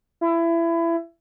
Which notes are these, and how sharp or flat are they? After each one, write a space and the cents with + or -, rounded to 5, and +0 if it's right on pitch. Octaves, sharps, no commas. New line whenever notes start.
E4 +25